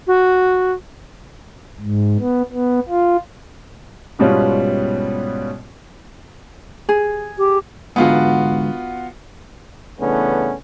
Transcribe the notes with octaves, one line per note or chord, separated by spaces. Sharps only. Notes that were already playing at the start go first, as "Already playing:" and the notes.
F#4
G#2
B3
B3
F4
G#2 B2 G3 B3 C#4 F4
G#4
G4
G#2 D3 B3 F4 F#4
C#3 E3 A3 B3 C#4 D4